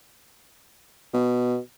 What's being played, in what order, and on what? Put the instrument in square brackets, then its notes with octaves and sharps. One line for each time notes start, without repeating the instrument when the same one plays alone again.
[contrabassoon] B2